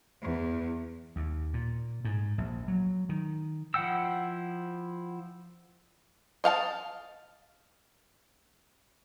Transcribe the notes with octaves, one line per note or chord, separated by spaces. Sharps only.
E2
D#2
A#2
G#2
A#1
F#3
D#3
F3 E4 F#5 G5 E6
D#5 F5 F#5 A5